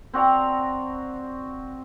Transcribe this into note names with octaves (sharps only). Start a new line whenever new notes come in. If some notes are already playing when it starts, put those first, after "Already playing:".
C4 F#4 D5 A#5